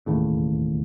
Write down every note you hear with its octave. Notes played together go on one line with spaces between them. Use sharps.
E1 D#2 A2 C#3